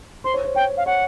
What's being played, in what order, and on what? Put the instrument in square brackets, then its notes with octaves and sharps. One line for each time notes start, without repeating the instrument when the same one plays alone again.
[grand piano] C5 [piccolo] C6
[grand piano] C#5
C5
[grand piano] C#5 [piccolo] G5
[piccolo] F5
[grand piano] C#5 [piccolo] F#5